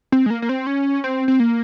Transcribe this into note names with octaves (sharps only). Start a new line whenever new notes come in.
C4
G#3
A#3
A#3
C4
C#4
C4
C4
A#3